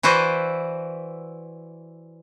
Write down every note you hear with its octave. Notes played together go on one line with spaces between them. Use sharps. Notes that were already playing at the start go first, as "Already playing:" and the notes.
E3 E4 F#4 B4 C5 D5